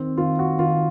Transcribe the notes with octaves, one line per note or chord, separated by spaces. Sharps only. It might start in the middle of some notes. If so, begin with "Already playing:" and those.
Already playing: D#3 C4
D#3 F4
F#4
D#3 F4